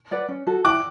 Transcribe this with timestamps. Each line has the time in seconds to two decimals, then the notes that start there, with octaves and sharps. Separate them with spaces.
0.11 B4 D5 F#5
0.28 C#4
0.47 F#4 A4
0.65 E4 D6 F#6